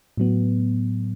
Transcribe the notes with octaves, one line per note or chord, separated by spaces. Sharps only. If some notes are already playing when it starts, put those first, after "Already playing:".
A2 F#3 B3